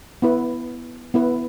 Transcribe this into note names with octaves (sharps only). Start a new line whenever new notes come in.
B3 E4 B4
B3 E4 B4